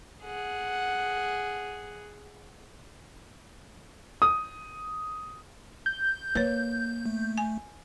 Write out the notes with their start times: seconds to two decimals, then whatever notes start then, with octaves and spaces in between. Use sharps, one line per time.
0.23 G#4 F#5
4.22 D#6
5.86 G6
6.35 A#3 B4 C#5
7.06 A3
7.38 G#5